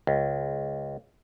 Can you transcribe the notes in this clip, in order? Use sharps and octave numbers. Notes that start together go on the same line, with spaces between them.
C#2